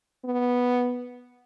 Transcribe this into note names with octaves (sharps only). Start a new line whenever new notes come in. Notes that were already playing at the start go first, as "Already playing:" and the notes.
B3